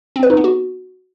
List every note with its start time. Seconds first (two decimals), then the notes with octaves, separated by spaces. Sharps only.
0.16 C4
0.23 B4
0.30 D#4
0.37 B3
0.44 F#4